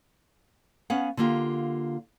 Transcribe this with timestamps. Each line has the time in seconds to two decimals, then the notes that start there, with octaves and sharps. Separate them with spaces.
0.90 B3 C#4 C#5 F5 F#5
1.17 D3 A#3 F4 G4